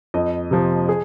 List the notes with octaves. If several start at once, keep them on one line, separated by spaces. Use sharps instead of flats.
F2 D#5
C3 F3
G#4